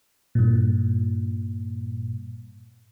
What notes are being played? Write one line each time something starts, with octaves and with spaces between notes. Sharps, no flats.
G2 A#2